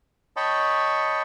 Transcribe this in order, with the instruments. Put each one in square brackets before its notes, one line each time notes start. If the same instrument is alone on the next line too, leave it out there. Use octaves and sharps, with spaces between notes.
[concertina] C#5 D#5 G5 A5 B5 C#6